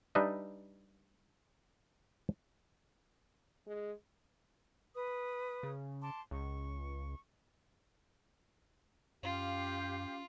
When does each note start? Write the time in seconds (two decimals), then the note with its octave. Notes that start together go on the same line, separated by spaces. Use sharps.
0.15 G3 D4 D#4 B4 D#5 E5
3.67 G#3
4.94 B4 D#6
5.63 C#3
6.02 A5 C6 D6
6.31 C#2 C#6
9.23 F#2 C#4 F4 G4 F5